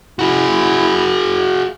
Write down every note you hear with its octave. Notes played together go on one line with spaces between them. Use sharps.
E4 F#4 G#4